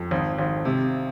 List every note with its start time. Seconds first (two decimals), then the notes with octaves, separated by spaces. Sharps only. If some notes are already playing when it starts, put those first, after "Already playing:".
Already playing: F2
0.11 G#1
0.38 G#1
0.65 C3